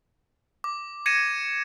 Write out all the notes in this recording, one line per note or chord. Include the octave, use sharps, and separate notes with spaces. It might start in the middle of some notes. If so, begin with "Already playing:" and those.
D6
G#6 A#6 C#7 D#7 E7